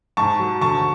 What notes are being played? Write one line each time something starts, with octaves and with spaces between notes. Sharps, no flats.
G#2 A5 C#6
F#3
D2 A5 C#6